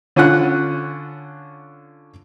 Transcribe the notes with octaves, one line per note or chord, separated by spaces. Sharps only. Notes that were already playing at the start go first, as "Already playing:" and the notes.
D3 C#4 F4 F#5 F#6